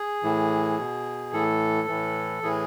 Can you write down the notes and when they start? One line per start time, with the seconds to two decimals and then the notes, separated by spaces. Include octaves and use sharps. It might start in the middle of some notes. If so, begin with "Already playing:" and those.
Already playing: G#4
0.23 A2 E3
0.78 B2
1.33 A2 E3 A4
1.88 A2 E3
2.43 A2 E3 G#4